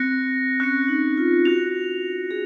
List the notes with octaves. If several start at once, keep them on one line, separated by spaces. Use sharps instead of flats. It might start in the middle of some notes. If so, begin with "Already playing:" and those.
Already playing: C4 F#6 A#6 C#7
C#4 F#6 A#6 C#7
D#4
F4
F#4 F#6 A#6 F7
G#4